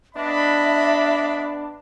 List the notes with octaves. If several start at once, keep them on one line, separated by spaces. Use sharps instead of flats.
B3 D4 D#5 E5 B5